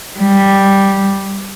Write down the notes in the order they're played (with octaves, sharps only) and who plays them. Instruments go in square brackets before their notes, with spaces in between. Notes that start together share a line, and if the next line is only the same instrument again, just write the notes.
[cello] G3